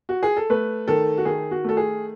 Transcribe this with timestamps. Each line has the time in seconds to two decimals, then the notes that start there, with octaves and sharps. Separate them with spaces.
0.09 F#4
0.23 G#4
0.37 A4
0.50 A3 B4
0.87 D#3 A4
1.18 F#4
1.25 D#3 G#4
1.51 F#4
1.64 A3 A4
1.77 G#4